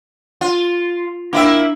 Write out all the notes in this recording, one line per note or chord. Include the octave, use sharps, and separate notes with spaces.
F4
A#3 D4 E4 E5 F5 G5